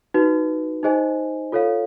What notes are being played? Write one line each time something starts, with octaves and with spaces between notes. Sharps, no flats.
D#4 F#4 B4
D#4 G#4 C5 D#5 G#5
F4 A4 C#5 F5